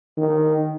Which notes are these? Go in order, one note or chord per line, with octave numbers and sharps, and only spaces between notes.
D#3